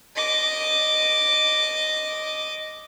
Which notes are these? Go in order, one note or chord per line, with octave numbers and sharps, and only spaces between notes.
D#5 D6